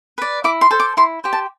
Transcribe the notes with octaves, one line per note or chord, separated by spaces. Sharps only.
B4 D5
E4 D6
C6
A4 C5
D6
E4 C6
G4 C5
A5